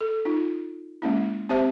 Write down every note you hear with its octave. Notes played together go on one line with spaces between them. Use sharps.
A4
D#4 F4
G#3 A#3 C#4 E4
C4 G4 C5 E5 A5